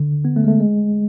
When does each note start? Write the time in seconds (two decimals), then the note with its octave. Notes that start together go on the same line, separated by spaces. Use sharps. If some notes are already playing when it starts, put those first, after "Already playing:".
Already playing: D3
0.25 B3
0.36 A3
0.44 G#3
0.48 A3
0.60 G#3